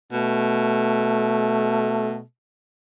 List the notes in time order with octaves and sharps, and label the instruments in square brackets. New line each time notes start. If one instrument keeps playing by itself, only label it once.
[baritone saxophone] B2 [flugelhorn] A3